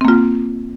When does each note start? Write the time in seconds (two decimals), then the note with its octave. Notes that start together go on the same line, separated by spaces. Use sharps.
0.01 C4
0.05 A#3
0.08 F4